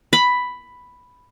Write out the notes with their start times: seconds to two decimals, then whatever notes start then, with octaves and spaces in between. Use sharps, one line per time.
0.13 B5